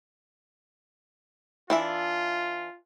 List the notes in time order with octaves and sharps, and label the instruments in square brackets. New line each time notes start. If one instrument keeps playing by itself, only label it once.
[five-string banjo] E3 D4 E5 [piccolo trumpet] F4